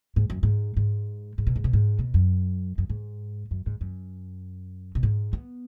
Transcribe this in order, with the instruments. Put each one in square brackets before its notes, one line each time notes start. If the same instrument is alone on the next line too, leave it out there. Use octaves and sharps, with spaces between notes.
[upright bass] G#2
F#2
G#2
G#2
G#2
B2
G#2
B2
G#2
B2
F#2
F#2
G#2
F#2
G#2
F#2
B2
G#2
B3